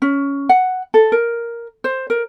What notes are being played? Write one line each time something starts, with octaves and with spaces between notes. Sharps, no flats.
C#4
F#5
A4
A#4
C5
A#4